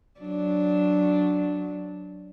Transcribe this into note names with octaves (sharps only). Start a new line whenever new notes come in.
F#3 D4